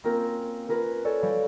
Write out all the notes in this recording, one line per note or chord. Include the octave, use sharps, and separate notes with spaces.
A#3 C4 C#4 F4 F#4 A#4
C#4 F4 A#4 B4
A4 C#5 D5 G#5
G3 F#4 F5